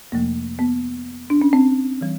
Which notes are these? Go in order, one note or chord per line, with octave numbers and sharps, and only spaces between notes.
F2 C3 F3 A3 A#3
B3
D4
C#4
C4
E3 G3